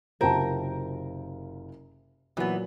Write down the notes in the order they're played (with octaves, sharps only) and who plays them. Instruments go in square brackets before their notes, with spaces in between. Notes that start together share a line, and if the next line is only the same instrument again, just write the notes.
[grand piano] F#1 C3 F4 [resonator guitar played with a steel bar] A#4 [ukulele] C5 G5 A5
[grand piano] A#2 F#3 [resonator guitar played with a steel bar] E3 B3